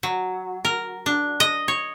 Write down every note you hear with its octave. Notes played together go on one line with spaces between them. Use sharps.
F#3
A#4
D4
D#5
C#5